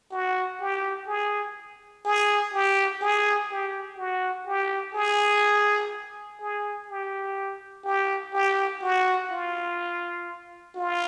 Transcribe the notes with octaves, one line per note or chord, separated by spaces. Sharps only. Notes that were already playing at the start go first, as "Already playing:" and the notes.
F#4
G4
G#4
G#4
G4
G#4
G4
F#4
G4
G#4
G#4
G4
G4
G4
F#4
F4
F4